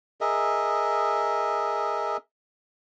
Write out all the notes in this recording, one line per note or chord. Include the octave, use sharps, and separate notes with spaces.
G#4 A#4 D#5 E5